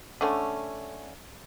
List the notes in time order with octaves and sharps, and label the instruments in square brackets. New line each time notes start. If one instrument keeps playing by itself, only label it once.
[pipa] D3 A3 C#4